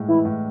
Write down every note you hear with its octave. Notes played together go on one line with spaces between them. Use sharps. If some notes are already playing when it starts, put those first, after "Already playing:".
Already playing: A2 G#3
E3 E4
A2